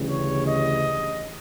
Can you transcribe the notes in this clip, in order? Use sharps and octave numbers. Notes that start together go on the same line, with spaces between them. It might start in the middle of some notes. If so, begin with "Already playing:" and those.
Already playing: D2 C#3 E3 G3
C#5
D#5